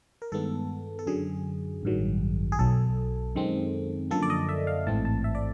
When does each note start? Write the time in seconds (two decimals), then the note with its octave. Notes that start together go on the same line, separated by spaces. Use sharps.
0.22 A#4
0.32 G2 D#3 G#3 B3 A4
0.99 A4
1.07 F#2 D3 F#3 G#4
1.83 A1 G2 D#3 F#3
2.52 G#4
2.59 B1 B2 F#3 A4
3.35 F#2 D#3 G#3 C4
4.11 F#2 D3 F3 A#3 A4
4.22 D5
4.30 D#5
4.49 E5
4.67 F5
4.87 A1 G#2 E3 A3 C4 A5
5.05 A5
5.24 E5
5.35 D5